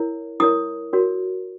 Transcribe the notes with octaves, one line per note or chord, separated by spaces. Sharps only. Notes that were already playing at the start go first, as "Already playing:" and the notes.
Already playing: E4 A#4 C#5
E4 A#4 C#5 D#6
F#4 A#4 C#5